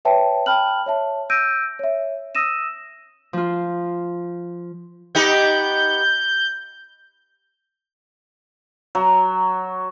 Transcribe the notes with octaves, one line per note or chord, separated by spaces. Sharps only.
B4 C#5 E5 G5 A5
G5 A5 B5 F6 F#6 F#7
C#5 E5 A5
E6 G6 A#6 D7 D#7
C#5 E5
D#6 E6 A#6 D#7 E7
F3 F4
B3 D#4 G4 G6
F#3